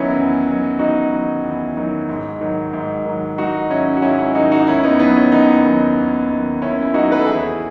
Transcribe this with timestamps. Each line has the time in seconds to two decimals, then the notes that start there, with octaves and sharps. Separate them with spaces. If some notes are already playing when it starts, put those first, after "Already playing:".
Already playing: E2 D#3 F#3 B3 C#4 D#4 E4
0.15 E2
0.47 D#3 F#3
0.79 E2 D#4 F#4
1.12 D#3 F#3
1.44 E2
1.77 D#3 F#3
2.09 G#2
2.41 D#3 F#3
2.73 G#2
3.06 D#3 F#3
3.38 G#2 D#4 F#4
3.70 D#3 F#3 C#4 E4
3.97 F#4
4.02 G#2 C#4 E4
4.19 C#4 E4
4.35 D#3 F#3 D#4 F#4
4.52 D#4 F#4
4.67 D#2 C#4 E4
4.83 B3 D#4
4.99 D#3 F#3 B3
5.16 C#4
5.32 D#2 B3 D#4
5.65 D#3 F#3
5.97 D#2
6.30 D#3 F#3
6.61 D#2 C#4 E4
6.82 E4
6.94 D#3 F#3 D#4 F#4
7.12 B4
7.19 A4
7.27 E2 E4 G#4